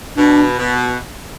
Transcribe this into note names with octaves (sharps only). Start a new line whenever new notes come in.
B2 D4
B2